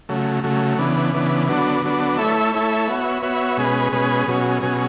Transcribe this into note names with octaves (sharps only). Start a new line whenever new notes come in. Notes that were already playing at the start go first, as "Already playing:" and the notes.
C#3 F#3 A3
C#3 F#3 A3
C#3 E3 B3 D4
C#3 E3 B3 D4
D3 F#3 B3 D4
D3 F#3 B3 D4
A3 E4 A4 C#5 E5
A3 E4 A4 C#5 E5
B3 F#4 C#5 E5
B3 F#4 C#5 E5
B2 G#3 C#4 G#4 B4
B2 G#3 C#4 G#4 B4
B2 F#3 C#4 G#4
B2 F#3 C#4 G#4